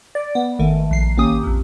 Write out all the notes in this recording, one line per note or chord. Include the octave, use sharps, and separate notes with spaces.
D5
B3
G#1 D#3 A3
A#1 C7
G#1 A#3 C#4 G4 D#6
A#1 F2